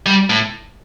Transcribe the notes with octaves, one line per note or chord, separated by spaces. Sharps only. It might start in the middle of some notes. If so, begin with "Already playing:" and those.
G3
A2